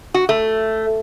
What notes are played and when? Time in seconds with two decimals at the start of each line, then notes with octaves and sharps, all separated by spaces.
0.14 F#4
0.29 A3